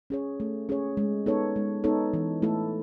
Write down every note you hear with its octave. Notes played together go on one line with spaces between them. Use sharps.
C#4 G#4 C#5
A3
C#4 G#4 C#5
G#3
B3 D#4 A4 C#5
G#3
B3 D#4 A4 C#5
E3
A3 E4 A4